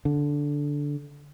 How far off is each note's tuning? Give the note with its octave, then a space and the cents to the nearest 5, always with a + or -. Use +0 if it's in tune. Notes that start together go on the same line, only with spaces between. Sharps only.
D3 -10